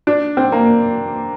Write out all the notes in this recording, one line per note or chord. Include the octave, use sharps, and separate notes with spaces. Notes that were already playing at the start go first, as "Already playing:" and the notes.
D4
C4
A#3